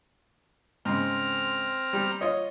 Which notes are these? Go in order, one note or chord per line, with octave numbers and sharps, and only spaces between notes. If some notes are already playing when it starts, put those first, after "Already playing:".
G#2 C#3 C4 A#5 F6
G3
F4 C#5 D#5